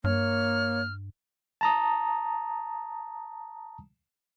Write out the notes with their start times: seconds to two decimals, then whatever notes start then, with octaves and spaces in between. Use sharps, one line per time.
0.04 G2 A#3 C#5 F6
1.61 A5 A#5 D#6